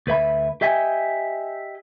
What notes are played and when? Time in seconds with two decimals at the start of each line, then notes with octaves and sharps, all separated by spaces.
0.07 D2 B4 E5 B5
0.61 G4 D#5 E5 G5 G#5